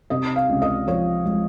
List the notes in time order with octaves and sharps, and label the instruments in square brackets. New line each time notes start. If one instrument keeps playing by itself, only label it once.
[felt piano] C3 D#5
F5
C#2
D#5
F3 C#5
G#3